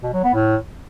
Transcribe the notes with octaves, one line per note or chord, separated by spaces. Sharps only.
B2
F#3
B3
A2